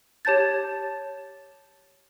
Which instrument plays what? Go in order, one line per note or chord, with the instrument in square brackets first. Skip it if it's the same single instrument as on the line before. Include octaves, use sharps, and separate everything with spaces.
[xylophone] G4 C#5 A5 G6 A6